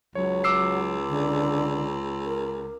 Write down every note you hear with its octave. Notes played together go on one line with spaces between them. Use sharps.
C#2 F#3 C#5
D6 E6 C7
D3
A#4